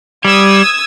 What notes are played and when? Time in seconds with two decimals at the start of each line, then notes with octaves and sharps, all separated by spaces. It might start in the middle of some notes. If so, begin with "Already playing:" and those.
0.25 G3 D#6 E6 G#6